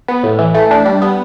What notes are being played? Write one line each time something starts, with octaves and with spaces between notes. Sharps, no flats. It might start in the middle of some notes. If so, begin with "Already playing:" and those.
B3
A2
E3
A3
D4
G3
B3